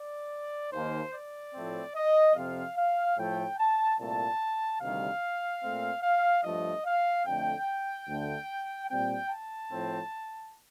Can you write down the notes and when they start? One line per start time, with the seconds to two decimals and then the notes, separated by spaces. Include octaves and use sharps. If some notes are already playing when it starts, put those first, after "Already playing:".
Already playing: D5
0.72 D#2 D#3 A#3 C5
1.13 D5
1.54 A2 F3 A3 C4
1.95 D#5
2.35 F2 C3 F3 C4 F5
2.76 F5
3.17 A2 F3 A3 G5
3.58 A5
3.99 C2 A#2 A3 A5
4.80 D2 C3 D#3 G3 F5
5.62 A#2 A3 C4
6.03 F5
6.44 G2 F3 A3 D#5
6.85 F5
7.26 F2 D3 A3 G5
8.07 D2 D3 A3
8.89 A#2 G3 C4 G5
9.30 A5
9.70 A2 F3 C4